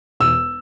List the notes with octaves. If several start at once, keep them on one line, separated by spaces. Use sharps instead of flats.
E1 E6